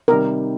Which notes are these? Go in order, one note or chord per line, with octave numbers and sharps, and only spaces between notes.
C3 D#3 G3 A#4